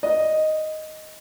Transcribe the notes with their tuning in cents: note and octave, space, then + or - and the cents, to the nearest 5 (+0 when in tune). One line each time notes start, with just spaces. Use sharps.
D#5 +0